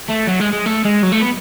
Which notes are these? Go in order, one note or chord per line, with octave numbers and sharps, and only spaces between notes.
A3
F#3
G#3
G#3
A3
G#3
F#3
A3
B3